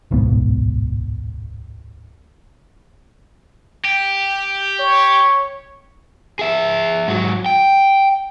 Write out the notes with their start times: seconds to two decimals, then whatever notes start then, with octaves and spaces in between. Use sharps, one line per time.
0.11 D1 B1 G#2 B3
3.84 G4
4.79 C#5
6.39 G#4 E5
7.08 G#2 F#3
7.46 G5